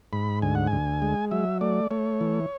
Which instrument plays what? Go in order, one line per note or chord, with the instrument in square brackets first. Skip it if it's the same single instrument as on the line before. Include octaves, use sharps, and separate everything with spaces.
[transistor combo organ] G#2 B5
D2 G#5
F#5
D2 G#5
G#3
F#3 E5
A3 D5
A3 C#5
E3